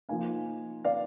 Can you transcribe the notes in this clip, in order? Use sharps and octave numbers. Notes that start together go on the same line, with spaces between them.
F3 A#3 D#4 F5 G#5
D5 F5